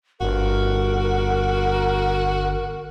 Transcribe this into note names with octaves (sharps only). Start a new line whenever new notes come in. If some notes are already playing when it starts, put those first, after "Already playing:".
G1 F#4 A#4